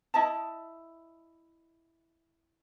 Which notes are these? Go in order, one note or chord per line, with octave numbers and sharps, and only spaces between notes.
E4 D#5 A5